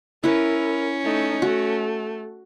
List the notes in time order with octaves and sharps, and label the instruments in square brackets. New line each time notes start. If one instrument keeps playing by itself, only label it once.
[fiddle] C#4 [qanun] E4 B4 [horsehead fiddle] A#4
[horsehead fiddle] A3 D#4
[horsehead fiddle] A3 [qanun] F#4